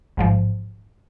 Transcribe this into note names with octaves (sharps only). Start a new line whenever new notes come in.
A1 G#2 F3